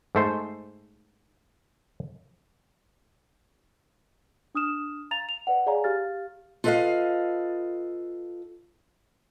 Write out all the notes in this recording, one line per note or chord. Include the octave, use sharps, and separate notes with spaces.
G#2 A3 C5
D4 D#6 F6 E7
F5 A#5 A6 F7
F7
B4 D5 F#5
G#4 C#5 D5 F5 G#5 A#5
G4 F5 F6 A6
F4 A4 B4 D5 D#5 F5